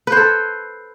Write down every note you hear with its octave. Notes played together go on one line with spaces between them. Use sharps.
A4 B4 C5